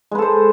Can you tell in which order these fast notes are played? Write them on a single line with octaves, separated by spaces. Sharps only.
G#3 B4 A4 C5